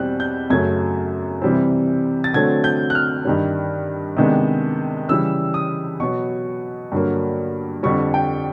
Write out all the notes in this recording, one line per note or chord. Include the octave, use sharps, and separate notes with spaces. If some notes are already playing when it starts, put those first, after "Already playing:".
Already playing: E2 B2 G3 C4 F#6
G6
F#2 C#3 F#3 A3 G#6
C3 E3 G3 C4
A6
D3 F#3 A3 C4 G#6
G6
F#6
F6
G2 D#3 G3
C3 D#3 G#3 B3 D4
C#3 E3 G3 E6
D#6
B2 F#3 B3 C#6
G2 D3 F#3 A#3
F2 D3 G3 C#6
G5